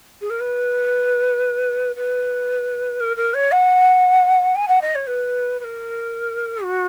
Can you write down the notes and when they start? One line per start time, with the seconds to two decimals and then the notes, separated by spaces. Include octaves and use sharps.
0.21 G#4
0.30 A#4
0.40 B4
1.96 B4
3.00 A#4
3.17 A#4
3.34 C#5
3.52 F#5
4.55 G#5
4.68 F#5
4.82 D#5
4.95 C#5
5.07 B4
5.60 B4
5.64 A#4
6.63 F#4